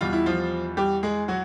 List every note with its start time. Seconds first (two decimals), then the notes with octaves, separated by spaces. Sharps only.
0.01 E2 B2 G3 F4
0.13 E4
0.26 F3 F4
0.77 G3 G4
1.03 G#3 G#4
1.28 F#3 F#4